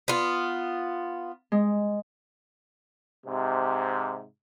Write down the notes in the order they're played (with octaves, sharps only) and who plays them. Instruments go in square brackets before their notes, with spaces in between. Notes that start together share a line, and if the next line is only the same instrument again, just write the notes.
[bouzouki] B3 F4
[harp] G#3
[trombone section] G#2 C3